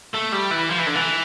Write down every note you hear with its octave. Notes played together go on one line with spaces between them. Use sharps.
A3
G3
E3
F3
E3
D3
E3